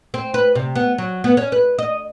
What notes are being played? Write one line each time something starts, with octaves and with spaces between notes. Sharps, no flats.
C4
B4
C3
B3
F#3
B3
C#4
B4
D#5